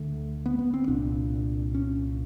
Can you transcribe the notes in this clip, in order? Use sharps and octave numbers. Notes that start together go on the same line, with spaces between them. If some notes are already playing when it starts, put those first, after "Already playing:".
Already playing: D2 D3 A3
B3
B3
C4
C2 A#2 D4
C#4